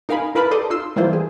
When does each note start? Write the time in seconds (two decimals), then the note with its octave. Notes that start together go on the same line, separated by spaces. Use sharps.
0.09 D#4 A#4 F5 G#5 B5
0.35 E4 A#4 B4 F5 A5 B5
0.51 G4 A4 D5 C6 D6 D#6
0.70 D#4 F4 C6 E6
0.96 E3 G3 A#3 E4 F4 C5
1.13 G#4